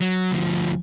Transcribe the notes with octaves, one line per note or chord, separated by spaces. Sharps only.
F#3
D2 F3